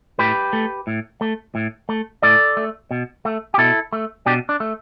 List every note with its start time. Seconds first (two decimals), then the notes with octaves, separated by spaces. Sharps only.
0.19 A2 G4 B4
0.53 A3
0.87 A2
1.21 A3
1.55 A2
1.89 A3
2.22 A2 A4 D5
2.57 A3
2.91 B2
3.25 A3
3.54 G4
3.58 B2 E4 A4
3.93 A3
4.26 B2 D4 G4
4.49 D4
4.60 A3